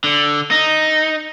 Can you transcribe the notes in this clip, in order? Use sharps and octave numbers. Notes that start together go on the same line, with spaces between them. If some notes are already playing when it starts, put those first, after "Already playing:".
D3
D#4